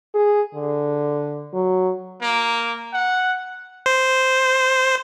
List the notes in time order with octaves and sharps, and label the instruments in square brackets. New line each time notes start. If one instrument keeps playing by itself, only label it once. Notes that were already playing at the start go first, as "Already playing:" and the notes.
[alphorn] G#4
D3
F#3
[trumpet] A#3
F#5
[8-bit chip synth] C5